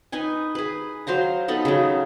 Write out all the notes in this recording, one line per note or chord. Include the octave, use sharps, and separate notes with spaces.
D#4 B4 G#5
G#4 B4
F#3 C5 F5 A#5
B3 D#4 A4 B5
C#3 F#3